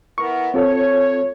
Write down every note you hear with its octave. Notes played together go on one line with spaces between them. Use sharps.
B3 E4 A#4 C#6
C4 F4 A4 C#5